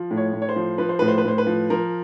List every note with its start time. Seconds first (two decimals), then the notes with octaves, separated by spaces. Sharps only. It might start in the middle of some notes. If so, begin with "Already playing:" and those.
Already playing: F3
0.11 A2
0.17 C#5
0.33 A2
0.42 C#5
0.49 C5
0.56 F3
0.78 F3 B4
0.89 C5
0.99 A2 B4
1.08 C5
1.18 B4
1.25 A2 C5
1.38 B4
1.47 F3
1.70 F3 A#4